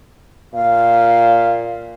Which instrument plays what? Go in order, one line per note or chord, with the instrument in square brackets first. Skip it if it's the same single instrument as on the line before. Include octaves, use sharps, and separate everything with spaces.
[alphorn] A#2 [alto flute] F5